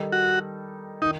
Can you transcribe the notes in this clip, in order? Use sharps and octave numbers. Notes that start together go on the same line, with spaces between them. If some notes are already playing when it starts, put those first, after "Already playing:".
Already playing: D#3 G3 D#4 A4
F#4
D#3 D#4